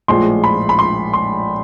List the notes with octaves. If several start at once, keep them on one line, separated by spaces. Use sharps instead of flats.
A#1 A2 F3 G#3 C6
B5
B5
C6
C6